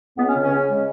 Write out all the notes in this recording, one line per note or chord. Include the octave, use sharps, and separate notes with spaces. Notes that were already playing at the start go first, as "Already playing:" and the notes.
C#2 B3
C#4
C#3
C#4
C#3
G#3